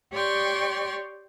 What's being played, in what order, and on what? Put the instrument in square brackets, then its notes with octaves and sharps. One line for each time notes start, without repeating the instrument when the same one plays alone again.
[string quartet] G4 C#5 D5 G5 C6 C#6